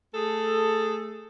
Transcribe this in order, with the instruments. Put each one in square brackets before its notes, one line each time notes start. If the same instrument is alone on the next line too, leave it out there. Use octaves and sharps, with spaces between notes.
[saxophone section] A3 G#4 A4